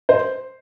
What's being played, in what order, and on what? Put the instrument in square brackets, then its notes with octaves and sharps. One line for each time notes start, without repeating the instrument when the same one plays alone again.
[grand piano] C5